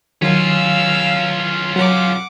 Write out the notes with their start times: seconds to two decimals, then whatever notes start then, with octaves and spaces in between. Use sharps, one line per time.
0.22 D#3 F#3 C#4 F4 F5 E6
1.76 F#3 F#5 D6